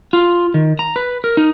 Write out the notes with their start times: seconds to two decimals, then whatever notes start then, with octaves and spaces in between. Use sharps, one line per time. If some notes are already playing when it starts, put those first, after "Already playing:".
0.13 F4
0.54 D#3
0.79 A#5
0.96 B4
1.24 A#4
1.37 D#4